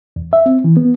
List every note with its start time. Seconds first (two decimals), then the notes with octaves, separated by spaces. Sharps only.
0.16 E2
0.33 E5
0.46 C4
0.64 E3
0.77 B3